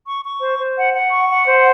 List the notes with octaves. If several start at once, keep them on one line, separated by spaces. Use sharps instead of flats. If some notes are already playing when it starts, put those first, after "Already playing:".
C#6
C#6
C5
C5
F#5
F#5
C#6
F#5
C5